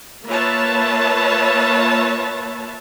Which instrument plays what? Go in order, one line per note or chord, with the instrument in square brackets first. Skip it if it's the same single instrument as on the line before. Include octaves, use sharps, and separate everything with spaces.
[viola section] A#3 F4 B4 C#5 E5 A5